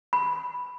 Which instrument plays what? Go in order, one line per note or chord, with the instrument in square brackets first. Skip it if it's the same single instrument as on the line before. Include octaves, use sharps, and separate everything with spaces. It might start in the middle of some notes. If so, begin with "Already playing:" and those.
[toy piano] B5